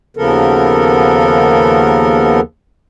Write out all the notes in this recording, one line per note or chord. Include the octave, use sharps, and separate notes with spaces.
D#2 C#3 F3 B3 A4 A#4